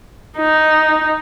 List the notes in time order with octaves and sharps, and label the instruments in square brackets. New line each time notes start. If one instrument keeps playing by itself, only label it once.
[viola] D#4